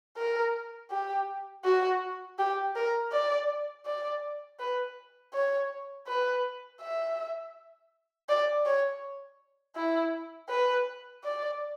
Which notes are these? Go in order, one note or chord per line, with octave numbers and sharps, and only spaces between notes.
A#4
G4
F#4
G4
A#4
D5
D5
B4
C#5
B4
E5
D5
C#5
E4
B4
D5